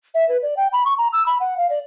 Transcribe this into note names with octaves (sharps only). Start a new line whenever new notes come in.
E5
B4
D5
G5
B5
C#6
A#5
E6
B5
F#5
F5
D5